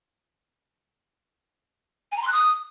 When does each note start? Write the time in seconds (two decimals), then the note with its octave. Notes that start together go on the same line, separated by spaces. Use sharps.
2.12 G#5
2.17 A#5
2.22 C6
2.27 F#6
2.32 D#6